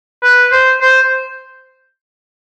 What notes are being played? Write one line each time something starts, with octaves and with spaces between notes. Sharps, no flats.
B4
C5
C5